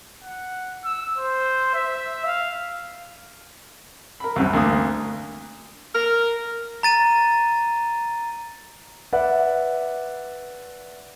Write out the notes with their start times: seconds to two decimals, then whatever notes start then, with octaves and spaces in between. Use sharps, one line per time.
0.24 F#5
0.84 E6
1.18 C5
1.74 E5
2.25 F5
4.20 A#4 B5
4.36 C2 F#2 C3
4.53 D2 A#3 D4 D#6
5.94 A#4
6.83 A#5 A6 D#7
9.13 B4 D5 E5 F#5